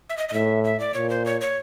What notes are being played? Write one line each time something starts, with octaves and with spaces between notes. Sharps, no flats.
E5
D#5
D#5
A2 E5
E5
D5
A#2 C#5
C5
C#5
C#5